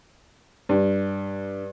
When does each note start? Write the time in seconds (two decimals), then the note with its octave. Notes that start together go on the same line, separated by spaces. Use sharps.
0.69 G2